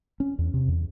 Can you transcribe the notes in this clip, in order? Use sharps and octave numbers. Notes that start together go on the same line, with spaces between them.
C#4
E2
C3
E2